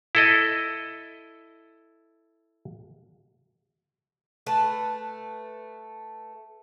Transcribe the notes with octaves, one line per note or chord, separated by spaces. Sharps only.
E4 A4 D#5
A3 B4 A5